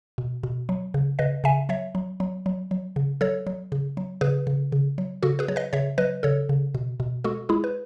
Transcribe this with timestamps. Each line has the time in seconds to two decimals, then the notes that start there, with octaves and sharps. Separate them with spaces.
0.18 B2
0.43 B2
0.69 F#3
0.94 C#3
1.19 C#3 B4 D#5
1.44 C#3 E5 G#5
1.69 F#3 C#5 E5
1.95 F#3
2.20 F#3
2.46 F#3
2.71 F#3
2.96 C#3
3.21 F#3 A4 C#5
3.47 F#3
3.72 C#3
3.97 F#3
4.21 C#3 G#4 B4
4.47 C#3
4.72 C#3
4.98 F#3
5.23 C#3 F#4 A4
5.39 G#4 B4
5.48 F#3 C#5
5.56 B4 D#5
5.73 C#3 C#5 E5
5.98 F#3 B4 D#5
6.23 C#3 A4 C#5
6.49 C#3
6.75 B2
7.00 B2
7.24 G#3 F#4 A4
7.49 G#3 E4 G#4
7.64 B4